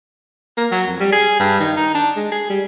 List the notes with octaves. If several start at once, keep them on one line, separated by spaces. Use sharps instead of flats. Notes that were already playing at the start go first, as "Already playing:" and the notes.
A#3
F#3
F2
G3
G#4
G2
D#3
D#4
D4
G#3
G#4
G3